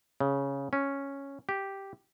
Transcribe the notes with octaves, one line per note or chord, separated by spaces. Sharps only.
C#3
C#4
G4